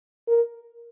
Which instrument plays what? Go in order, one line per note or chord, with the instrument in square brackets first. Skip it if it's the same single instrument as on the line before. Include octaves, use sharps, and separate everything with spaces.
[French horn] A#4